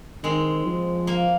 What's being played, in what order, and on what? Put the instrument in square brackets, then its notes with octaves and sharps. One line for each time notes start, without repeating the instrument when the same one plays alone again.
[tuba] D#3 [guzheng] G#3 C4
[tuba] F3
[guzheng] A#3